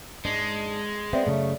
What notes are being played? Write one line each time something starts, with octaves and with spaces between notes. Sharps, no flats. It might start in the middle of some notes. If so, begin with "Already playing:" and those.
G#2 G#3 D4 D#5
B3 C4 D5 E5
F#2 C#3 A3